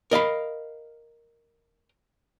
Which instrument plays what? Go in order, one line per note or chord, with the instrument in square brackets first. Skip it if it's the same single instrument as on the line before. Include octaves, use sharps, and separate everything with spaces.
[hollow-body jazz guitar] A#4 D#5 F5 B5